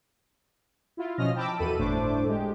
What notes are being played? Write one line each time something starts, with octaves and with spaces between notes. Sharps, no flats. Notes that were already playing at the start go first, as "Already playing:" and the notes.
E4 F4
B2 F3 C#4 D#5 F6 A#6
G5 A5 B5 D6 E6
E2 B2 A4 B5 D#7
G1 A2 A3 D4 C5 D6
G#3 G4